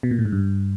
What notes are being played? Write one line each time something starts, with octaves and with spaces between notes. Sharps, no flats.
B2
A#2
A2
G#2
G2